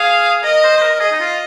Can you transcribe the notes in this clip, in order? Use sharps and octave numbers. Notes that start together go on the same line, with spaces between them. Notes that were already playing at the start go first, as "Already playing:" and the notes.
Already playing: G#4 F5
A#4 D#5
C5
C5
A#4
A#4
G#4 D#5
D#4
F4